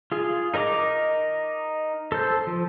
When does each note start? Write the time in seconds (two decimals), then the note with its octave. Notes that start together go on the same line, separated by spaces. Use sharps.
0.12 F4 G#4
0.54 D#4 A#4 D#5 A#5 D6
2.12 A4 C5
2.47 F3